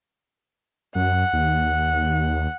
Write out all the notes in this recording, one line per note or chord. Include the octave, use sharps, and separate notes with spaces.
F#2 F#5
D#2